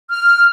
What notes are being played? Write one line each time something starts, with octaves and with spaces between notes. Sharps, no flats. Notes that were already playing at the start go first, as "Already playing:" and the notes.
F6